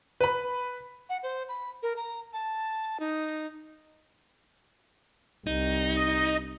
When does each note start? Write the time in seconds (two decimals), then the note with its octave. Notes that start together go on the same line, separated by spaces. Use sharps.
0.21 B4 B5
1.09 F#5
1.23 C5
1.48 B5
1.83 A#4
1.97 A#5
2.33 A5
3.00 D#4
5.47 C2 D#4
5.96 D#5